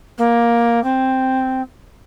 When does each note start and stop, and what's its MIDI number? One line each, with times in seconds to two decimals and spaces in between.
0.18 0.81 58
0.83 1.61 60